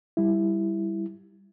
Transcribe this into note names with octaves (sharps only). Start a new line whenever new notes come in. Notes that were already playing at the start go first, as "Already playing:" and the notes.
G3 E4